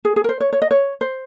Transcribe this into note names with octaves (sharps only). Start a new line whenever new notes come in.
G#4
G#4
A#4
C5
C#5
C#5
D#5
C#5
C5